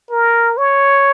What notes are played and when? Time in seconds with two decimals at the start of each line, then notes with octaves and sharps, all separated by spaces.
0.11 A#4
0.58 C#5